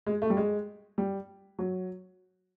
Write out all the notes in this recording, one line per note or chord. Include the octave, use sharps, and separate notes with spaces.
G#3
A3
G3
G#3
G3
F#3